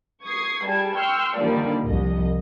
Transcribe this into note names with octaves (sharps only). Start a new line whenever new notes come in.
C#6 D#6 G#6 C7
G3 G#4 A5 G#6
G5 C6 C#6 E6 F6
D3 D#3 F3 G3 A#3 D5
C2 F3 D#5